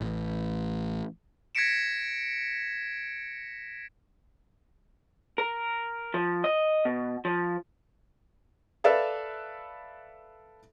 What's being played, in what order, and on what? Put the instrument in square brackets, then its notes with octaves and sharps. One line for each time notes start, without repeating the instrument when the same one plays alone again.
[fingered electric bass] A1
[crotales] G#6 A#6 B6 C#7 D7 E7
[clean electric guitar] A#4
F3
D#5
B2
F3
[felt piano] A4 B4 D5 E5 F5